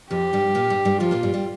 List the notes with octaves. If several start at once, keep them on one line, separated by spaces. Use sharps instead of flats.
F2 F3 G4
G2 G3
A#2 A#3
G2 G3
G2 G3
F2 F3 F4
A#2 A#3
G2 G3
G3